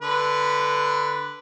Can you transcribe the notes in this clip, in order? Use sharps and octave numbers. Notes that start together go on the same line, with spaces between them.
D3 B4